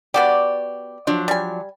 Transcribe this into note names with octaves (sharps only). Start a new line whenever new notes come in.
B3 F#4 G4 D5
F3 F#3 D4
G3 G#5